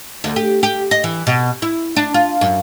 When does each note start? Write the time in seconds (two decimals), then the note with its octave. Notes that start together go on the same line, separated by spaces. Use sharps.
0.24 D2
0.36 G4
0.63 G4
0.91 D#5
1.04 E3
1.27 B2
1.62 E4
1.96 D4
2.14 F4
2.41 F#2